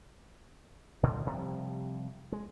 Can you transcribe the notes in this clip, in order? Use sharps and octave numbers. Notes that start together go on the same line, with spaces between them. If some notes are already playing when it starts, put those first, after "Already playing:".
A#2 D3 D#3 A3
C3 F3 G3
G#3